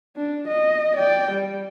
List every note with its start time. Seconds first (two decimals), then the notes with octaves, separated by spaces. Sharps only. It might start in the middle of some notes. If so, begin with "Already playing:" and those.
0.17 D4
0.48 D#5
0.96 D5 G5
1.31 G3